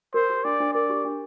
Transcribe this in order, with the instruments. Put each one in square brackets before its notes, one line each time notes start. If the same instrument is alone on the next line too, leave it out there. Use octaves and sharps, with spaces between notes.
[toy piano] A#4 [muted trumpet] C5
[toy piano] G4
[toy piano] D4 [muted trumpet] D5
[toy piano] D4
[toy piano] A#4 [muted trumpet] D5
[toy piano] G4
D4